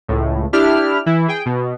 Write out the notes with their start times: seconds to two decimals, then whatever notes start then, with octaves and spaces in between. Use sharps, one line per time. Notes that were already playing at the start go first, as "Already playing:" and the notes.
0.08 C#2 A2
0.53 D4 E4 G4 F6
1.06 E3 E4
1.28 G#4 G5
1.46 B2